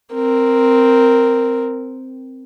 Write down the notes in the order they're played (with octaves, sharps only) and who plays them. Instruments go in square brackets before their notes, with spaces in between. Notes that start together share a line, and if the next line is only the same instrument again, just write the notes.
[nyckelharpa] C4 A#4